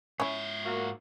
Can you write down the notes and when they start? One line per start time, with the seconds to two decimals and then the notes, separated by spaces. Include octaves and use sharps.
0.20 G#2 C#4 E4 E5
0.64 A#3 F#4